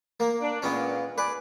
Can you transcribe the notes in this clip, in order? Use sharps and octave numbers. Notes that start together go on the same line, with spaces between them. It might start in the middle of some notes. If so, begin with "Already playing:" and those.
A#3
D4
A#2 G#3 A#3 B3 C#4
G#4 B4 D5